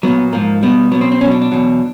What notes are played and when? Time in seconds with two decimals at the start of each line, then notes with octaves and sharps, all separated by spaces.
0.03 A#2 F#3 B3
0.33 G#2 F3 A#3
0.63 B2 G3 B3
0.92 F#3 B3
0.95 B2
1.01 C4
1.12 C4
1.21 B2 F#3 C#4
1.31 D4
1.42 D4
1.52 E2 B2 F#3